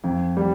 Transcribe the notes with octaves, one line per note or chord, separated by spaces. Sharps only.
F2
G3